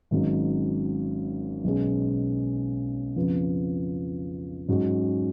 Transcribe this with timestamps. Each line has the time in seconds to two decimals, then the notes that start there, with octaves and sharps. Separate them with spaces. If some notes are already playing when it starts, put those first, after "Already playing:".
0.11 G#1 G#2 F#3 C#4
1.64 B1 B2 G#3 C#4
3.16 F2 C#3 F3 B3
4.68 G#2 F#3 C#4 F#4